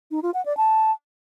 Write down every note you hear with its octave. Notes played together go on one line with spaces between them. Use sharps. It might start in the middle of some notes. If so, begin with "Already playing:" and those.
D#4
F4
F#5
D5
A5